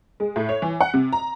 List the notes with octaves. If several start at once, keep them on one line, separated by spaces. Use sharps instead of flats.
G#3
A2
C#5
E3
F#5
C3
A#5